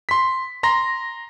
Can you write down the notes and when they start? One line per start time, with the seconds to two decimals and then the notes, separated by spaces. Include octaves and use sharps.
0.09 C6 B6
0.63 A#5 C6 A#6